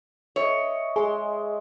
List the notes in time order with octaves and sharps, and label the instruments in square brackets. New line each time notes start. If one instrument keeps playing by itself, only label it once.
[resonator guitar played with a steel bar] C#5 [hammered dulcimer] D#5 E5
[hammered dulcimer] G#3 C6 [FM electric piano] G#4